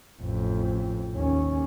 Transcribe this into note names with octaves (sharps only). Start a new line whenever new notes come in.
A1 F2
D#2 C#4